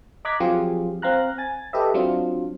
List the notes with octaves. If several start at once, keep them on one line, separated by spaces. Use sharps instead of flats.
D#5 A#5 D6 F#6 G#6 B6
F3 F#3 C4 F4 G4 G#4
C4 F5 A#5 F#6
G#5 A6
G4 A4 B4 D#5 E5
F#3 C4 D4 F4